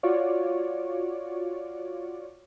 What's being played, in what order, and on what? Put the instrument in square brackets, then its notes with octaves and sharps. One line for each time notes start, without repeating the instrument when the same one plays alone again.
[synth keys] F4 F#4 C#5 D5